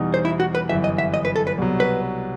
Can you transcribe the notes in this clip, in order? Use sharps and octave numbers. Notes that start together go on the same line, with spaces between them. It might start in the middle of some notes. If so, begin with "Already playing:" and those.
Already playing: E2 B2 G3 D#4
C5
E4
F#4
B4
G1 F#2 E3 E5
D#5
E5
D#5
B4
A4
B4
C2 B2 F#3
B4